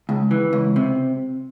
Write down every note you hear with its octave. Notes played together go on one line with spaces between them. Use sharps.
C#2
E3
C#2
C3